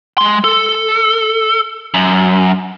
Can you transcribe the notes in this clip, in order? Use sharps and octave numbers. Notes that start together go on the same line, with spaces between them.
G#3 C6
A4
F#2